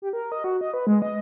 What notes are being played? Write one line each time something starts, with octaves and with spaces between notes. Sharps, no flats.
G4
A#4
D#5
F#4
D#5
B4
G#3
D#5